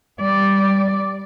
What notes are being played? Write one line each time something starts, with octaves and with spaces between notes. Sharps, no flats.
G3 D5